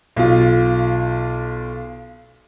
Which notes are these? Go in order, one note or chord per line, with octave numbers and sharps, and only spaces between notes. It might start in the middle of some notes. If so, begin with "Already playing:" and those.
B1 F4